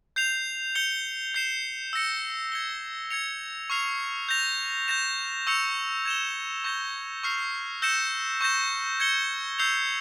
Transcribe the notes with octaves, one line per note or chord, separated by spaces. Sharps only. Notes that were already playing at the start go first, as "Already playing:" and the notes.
G6 C7 F7
G6 C#7 G7
G6 C7 E7
E6 A#6 C#7
G#6 C#7 G7
G#6 C#7 F7
C#6 F6 C7 F7
G6 A#6 F7
G6 A#6 E7
C#6 E6 G6 C#7 F7
G#6 E7 G7
C#6 G6 A#6 E7 G7
C#6 F6 C7 F7
E6 G6 A#6 C#7 E7
C#6 G6 A#6 E7
G#6 C#7 G7
E6 G6 C7 F7